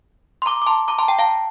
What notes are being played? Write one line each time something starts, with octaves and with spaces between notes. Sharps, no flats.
C6
A#5 D6
D6
A5 C6
A#5 D6
A5 C6
G5 A#5
F5 A5